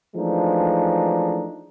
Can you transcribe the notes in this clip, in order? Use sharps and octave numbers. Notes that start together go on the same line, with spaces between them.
E3 F3 G#3 A3 D4 D#4